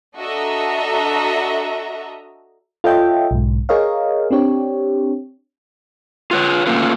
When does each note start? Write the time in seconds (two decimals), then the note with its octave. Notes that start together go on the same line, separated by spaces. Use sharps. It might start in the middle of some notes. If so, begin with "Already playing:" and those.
0.18 D4 F#4 A4 D#5 E5 A#5
2.84 F4 A4 C#5 D#5 E5 G5
3.31 B1 G#2
3.69 G#4 A#4 C#5 D#5 F5
4.31 C4 D4 G4 C#5
6.31 F4 B4 C#5
6.67 A3 A#3 C#4 F4 B4